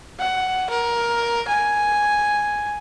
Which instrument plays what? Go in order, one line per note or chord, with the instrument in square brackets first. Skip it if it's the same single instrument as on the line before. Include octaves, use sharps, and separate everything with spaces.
[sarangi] F#5
A#4
G#5